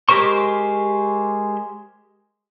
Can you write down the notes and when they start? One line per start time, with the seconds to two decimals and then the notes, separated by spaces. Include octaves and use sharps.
0.09 G#3 G4 A#4 C5 C#6